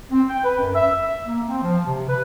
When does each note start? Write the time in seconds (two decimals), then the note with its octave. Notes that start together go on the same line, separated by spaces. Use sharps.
0.11 C4
0.29 G5
0.44 B4
0.58 F#2
0.75 E5
1.01 E5
1.27 A#3
1.48 C4
1.62 F3
1.86 C3
2.09 B4